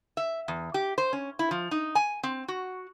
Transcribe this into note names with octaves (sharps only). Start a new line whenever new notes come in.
E5
E2
G4
C5
C#4
E4
F3
D#4
G#5
C4
F#4